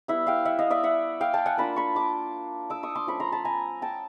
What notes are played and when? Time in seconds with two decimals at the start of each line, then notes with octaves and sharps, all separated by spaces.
0.08 G3 B3 E4 E5 F#5
0.27 F5 G5
0.45 E5 F#5
0.59 D#5 F5
0.70 D5 E5
0.83 E5 F#5
1.21 F5 G5
1.34 G5 A5
1.46 F#5 G#5
1.58 A#3 D4 F4 A5 B5
1.76 B5 C#6
1.95 C6 D6
2.70 D6 E6
2.83 C#6 D#6
2.95 C6 D6
3.07 F3 A3 C#4 B5 C#6
3.20 A#5 C6
3.32 A5 B5
3.45 G#5 A#5
3.82 G5 A5